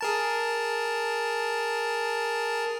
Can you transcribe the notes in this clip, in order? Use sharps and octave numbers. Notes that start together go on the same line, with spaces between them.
G#4 A#4 A5